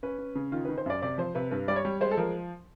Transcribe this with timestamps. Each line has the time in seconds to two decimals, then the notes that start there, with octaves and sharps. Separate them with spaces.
0.03 C#4 B4
0.19 C#4
0.35 C#3
0.52 D#3 F4
0.65 B4
0.69 D#3
0.78 C5
0.86 F#2 D5
1.02 C3 D5
1.18 F3 C5
1.35 C3 B4
1.51 G2 B4
1.68 G3 D5
1.76 C#5
1.85 G3
2.01 G#3 C5
2.11 A4
2.17 F3 A#4